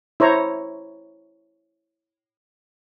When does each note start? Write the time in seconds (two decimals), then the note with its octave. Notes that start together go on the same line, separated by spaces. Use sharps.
0.20 E4 C5 C#5 A#5